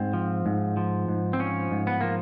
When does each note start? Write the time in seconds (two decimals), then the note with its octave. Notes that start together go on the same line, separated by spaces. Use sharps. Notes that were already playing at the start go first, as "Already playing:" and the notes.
Already playing: G#2 C4
0.13 F3
0.46 G#2
0.77 F3
1.08 G#2
1.33 C4
1.40 F3 C#4
1.71 G#2
1.87 B3
2.01 F3 A#3